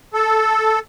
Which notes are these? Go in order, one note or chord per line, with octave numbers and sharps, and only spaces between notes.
A4